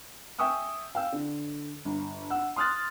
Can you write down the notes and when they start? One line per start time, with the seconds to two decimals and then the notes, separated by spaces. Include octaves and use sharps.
0.39 E5 G5 G#5 C#6 D#6 E6
0.95 F5 G5 E6
1.12 D3
1.85 G1
2.30 F#5 E6
2.56 C6 D#6 F6 F#6 A6